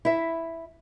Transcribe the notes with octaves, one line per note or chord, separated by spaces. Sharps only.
E4 E5